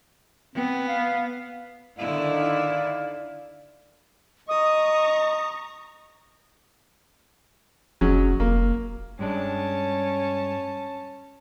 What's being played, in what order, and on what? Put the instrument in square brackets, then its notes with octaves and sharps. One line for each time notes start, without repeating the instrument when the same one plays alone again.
[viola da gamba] B3 [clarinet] C4
[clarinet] F5
[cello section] D3 D#3 E4 [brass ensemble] D5 F5
[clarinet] D#5 [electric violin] A#5 C#6 [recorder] D#6
[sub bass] F1 [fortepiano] F#3 G#3 C#4
[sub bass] F1 [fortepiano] A#3
[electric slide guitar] G2 G#3 D4 [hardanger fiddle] C#4 A5